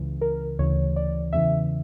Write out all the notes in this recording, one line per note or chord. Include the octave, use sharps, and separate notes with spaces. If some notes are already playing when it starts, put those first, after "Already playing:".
Already playing: C#2 C#3 E3
A#4
D2 C#3 E3 C#5
D5
E2 C#3 E3 E5